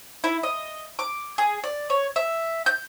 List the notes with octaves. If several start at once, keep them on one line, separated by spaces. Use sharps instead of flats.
E4
D#5
D6
G#4
D5
C#5
E5
G6